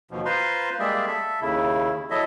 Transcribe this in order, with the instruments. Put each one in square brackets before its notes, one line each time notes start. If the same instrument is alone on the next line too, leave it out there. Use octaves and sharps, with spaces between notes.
[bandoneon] D#2 B2 F3
F4 B4 C5 A#5 C6
G3 G#3 A#3 G#4 D5 E5
A4 E5
D#2 C#3 E4
F#3 E4 A4 D#5 E5